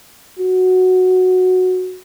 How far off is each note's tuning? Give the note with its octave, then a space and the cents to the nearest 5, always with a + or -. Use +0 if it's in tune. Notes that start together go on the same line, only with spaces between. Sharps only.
F#4 -5